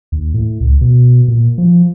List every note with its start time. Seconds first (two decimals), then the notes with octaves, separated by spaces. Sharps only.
0.12 D#2
0.34 A2
0.61 C#2
0.81 B2
1.28 A#2
1.58 F3